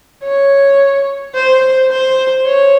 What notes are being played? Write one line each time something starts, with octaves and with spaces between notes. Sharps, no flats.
C#5
C5
C5
C#5